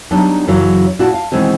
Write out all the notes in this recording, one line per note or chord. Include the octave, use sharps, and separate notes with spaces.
F#3 G3 B3 D4 D#4
F#2 C#3 E3 F#3
A#2 E4 F#4 A5
F5
B2 D#3 E3 G#3 C4 G#4